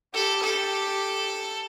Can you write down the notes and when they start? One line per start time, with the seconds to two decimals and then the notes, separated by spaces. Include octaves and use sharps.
0.14 G4 A4
0.43 G4 A4